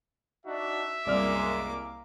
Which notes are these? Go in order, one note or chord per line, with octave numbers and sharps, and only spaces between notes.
D4 D#4 F#4 E5
C2 F#2 G#3 A#3 D5 D6 F6